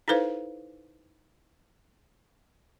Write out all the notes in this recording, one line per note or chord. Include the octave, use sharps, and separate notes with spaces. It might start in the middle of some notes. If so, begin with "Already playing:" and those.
D#4 E4 A4 B4 C5 F5